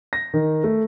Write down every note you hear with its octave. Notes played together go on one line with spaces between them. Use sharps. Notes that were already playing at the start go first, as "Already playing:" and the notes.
A#6
D#3
A3